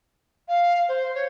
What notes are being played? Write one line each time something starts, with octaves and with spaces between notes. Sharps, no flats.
F5
C5
C#5